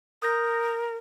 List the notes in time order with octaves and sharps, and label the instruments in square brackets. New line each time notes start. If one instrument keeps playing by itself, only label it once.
[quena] A#4 [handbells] D#6 G6 A#6